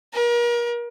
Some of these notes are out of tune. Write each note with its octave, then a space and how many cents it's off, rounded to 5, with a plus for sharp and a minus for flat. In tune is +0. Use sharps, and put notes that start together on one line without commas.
A#4 +35